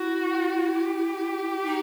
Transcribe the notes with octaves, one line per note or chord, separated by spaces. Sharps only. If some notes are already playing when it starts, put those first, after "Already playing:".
Already playing: E4 F#4
G4
D#4